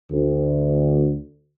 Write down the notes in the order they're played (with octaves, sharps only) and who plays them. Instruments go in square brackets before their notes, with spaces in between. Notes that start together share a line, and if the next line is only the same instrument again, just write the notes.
[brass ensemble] D2